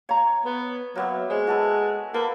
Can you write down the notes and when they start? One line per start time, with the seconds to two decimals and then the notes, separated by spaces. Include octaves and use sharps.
0.09 C#5 F5 A#5
0.45 B3 B4
0.95 F#3 A#3 B3 E5
1.30 G#3 C5 C#5
1.47 F4 F#4 A4 B4
2.14 A#3 A4 B4 F5